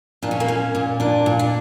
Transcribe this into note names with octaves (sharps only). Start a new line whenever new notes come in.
A#2 D4
C#4
A#3
A#2 C#4
A#2
A#2 D4
A#2
D4